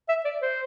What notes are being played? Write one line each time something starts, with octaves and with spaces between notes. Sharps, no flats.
E5
D5
C5